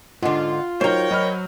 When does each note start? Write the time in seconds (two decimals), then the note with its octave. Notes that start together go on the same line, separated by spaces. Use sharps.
0.23 G#2 D3 F4 F#5 C6
0.81 F#3 D#4 A#4 C5 C#5 G5 A#5 G6
1.11 F#3 D#5 B5 F6